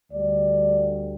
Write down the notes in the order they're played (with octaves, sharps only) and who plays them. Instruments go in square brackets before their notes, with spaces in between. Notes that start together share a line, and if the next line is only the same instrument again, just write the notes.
[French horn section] D2 D3 G3 D5